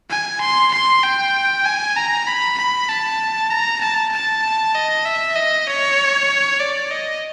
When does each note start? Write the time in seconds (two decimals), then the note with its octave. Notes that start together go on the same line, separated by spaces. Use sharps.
0.10 G#5
0.41 C6
0.72 C6
1.03 G5
1.65 G#5
1.96 A#5
2.27 B5
2.58 B5
2.89 A5
3.51 A#5
3.81 A5
4.13 A5
4.75 D#5
5.05 E5
5.36 D#5
5.67 C#5
6.60 D5
6.91 D#5